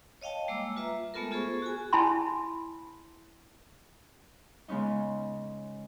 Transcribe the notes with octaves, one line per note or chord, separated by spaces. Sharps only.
C#5 D#5 F5 G5 A5
G3 G#3 A#3 D6 E6
F4 B4 E5 A#5
G#3 A3 B3 F4 A4 A#4
B3 F4 G#4 A4 C5 C#6
F#4 G#4 G#5
E4 G#5 A5 B5 C6
C#3 G#3 B3 C#4 D#4